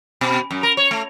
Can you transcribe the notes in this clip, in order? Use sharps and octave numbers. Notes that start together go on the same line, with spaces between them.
B2
F#2
A#4
C#5
A3